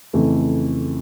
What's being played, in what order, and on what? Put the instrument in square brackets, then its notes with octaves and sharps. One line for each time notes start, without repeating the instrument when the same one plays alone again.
[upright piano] F2 C#3 E3 A3